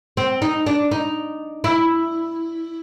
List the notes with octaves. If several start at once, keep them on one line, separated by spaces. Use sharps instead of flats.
C4
D#4
D4
D#4
E4